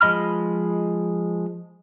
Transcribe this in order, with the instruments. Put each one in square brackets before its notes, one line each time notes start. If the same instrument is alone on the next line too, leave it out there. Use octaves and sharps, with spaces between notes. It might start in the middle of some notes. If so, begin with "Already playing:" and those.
[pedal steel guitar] F3 G#3 D#5 B5 F6